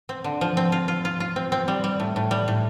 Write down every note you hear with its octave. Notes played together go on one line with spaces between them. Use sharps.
C4
D3
F3
C4
F4
F4
F4
F4
C4
C4
G3
G3
A2
A2
G3
A2